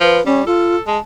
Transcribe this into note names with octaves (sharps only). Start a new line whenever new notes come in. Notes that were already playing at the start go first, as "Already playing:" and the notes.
F3 B4
G3 C#4
F4 A4
G#3 A5